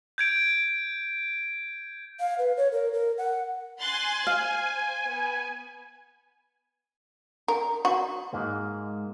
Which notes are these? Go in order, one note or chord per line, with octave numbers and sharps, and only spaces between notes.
G6 G#6 D7
F5
B4
C#5
A#4
A#4
F#5
G#5 C6 F#6 A6
C5 F5
B3
A#4
F#4
G#2 G#3 A#3